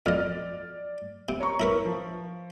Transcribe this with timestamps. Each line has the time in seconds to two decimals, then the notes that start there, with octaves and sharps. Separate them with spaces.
0.06 F2 D5 D#5 F6
1.29 C3
1.40 C#5 A#5 C#6
1.60 E4 A#4 B4
1.85 F3